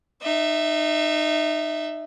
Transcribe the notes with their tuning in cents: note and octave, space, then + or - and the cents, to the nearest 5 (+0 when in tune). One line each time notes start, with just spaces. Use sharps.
D#4 -25 E5 +0